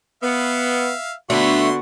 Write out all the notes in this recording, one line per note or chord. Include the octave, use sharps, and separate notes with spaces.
B3 E5 F5
D3 A3 B3 D4 F#4 C6